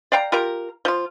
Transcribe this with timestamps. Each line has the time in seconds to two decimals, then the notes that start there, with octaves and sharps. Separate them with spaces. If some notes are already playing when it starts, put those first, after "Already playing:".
0.12 D5 F5 G5 A#5
0.32 F4 G4 A#4 A#5
0.85 F3 F4